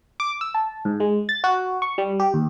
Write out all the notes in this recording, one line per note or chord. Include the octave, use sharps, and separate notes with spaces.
D6
E6
A5
G#2
G#3
A6
F#4
C#6
G3
G4
D#2